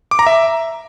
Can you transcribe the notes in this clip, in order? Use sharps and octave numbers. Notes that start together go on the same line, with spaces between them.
D6
A#5
E5